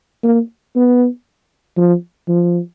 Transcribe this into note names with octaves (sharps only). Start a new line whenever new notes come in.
A#3
B3
F3
F3